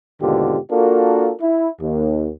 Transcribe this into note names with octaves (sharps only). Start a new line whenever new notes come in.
D#2 G#2 B2 D3 F4 G4
A#3 D4 F4 F#4 A4 A#4
E4
D#2